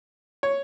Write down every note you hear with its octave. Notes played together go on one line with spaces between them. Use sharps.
C#5